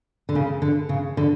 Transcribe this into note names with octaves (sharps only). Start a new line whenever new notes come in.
D3
C#3
D3
C#3
D3